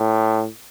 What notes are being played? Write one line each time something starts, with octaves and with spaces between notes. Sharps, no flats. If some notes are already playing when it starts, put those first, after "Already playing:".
Already playing: A2